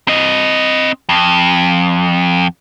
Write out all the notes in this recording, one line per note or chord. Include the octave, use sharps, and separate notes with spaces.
C4 D#5
F2